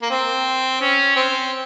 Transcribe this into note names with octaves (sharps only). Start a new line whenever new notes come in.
A#3
C4
C#4
C4